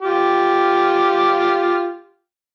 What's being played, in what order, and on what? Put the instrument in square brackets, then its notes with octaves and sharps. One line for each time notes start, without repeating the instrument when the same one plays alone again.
[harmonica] F4 G4